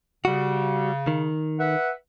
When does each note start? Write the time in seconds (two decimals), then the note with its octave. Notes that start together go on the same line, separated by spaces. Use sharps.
0.25 C#3 G3 F#4
1.07 D#3
1.59 B4 E5 F#5